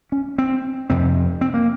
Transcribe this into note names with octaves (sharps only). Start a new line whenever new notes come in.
C#4
C4
F2 C3 C4
C4
A#3